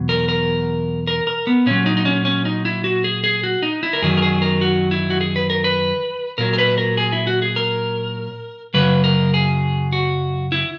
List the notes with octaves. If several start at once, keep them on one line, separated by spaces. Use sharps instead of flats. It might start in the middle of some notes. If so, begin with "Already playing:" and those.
Already playing: E2 B2 F#3
A#4
A#4
A#4
A#4
B3
A#2 F#3 C#4
D#4
D#4
C#4
C#4
D#4
E4
F#4
G#4
G#4
F#4
D#4
E4
A#4
F#2 D#3 F#3 G#4
A#4
G#4
A#4
F#4
E4
F#4
G#4
B4
A#4
B4
A#2 F#3 A#4
A#4
B4
A#4
G#4
E4
F#4
G#4
A#4
F#2 C#3 F#3 B4
A#4
G#4
F#4
E4